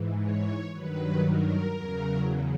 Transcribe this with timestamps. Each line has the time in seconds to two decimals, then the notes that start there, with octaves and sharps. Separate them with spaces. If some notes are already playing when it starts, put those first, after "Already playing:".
Already playing: G#2 E3
0.18 C#5
0.71 G2 D#3 F#3 B4
1.24 A#4
1.76 E2 C#3 F#3